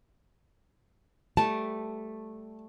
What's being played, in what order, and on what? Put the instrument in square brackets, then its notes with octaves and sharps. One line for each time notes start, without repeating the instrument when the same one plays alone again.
[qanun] G3 A3 B4 [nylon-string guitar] A5